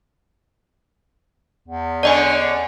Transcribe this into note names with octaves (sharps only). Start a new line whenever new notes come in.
E2
D3 C#4 D5 D#5 G#5